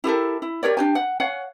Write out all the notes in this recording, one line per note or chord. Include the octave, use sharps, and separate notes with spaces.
E4 G4 A4 A#4
E4
G4 A#4 C#5 D5
D4 G4 G#5
F#5
C#5 F5 F#5 G#5